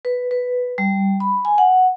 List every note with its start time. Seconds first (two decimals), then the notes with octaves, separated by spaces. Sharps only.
0.05 B4
0.31 B4
0.78 G3
1.20 B5
1.45 G#5
1.58 F#5